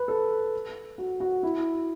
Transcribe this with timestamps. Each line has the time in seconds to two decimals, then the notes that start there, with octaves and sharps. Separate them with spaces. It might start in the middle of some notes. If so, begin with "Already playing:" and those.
Already playing: B4
0.08 A4
0.98 F#4
1.20 F#4
1.43 E4